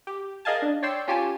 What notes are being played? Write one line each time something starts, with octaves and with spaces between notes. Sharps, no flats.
G4
G#4 A#4 D#5 F5 G#5 A5
D4
C#5 D5 G5 C6 E6
C#4 F4 G4 G#5 A5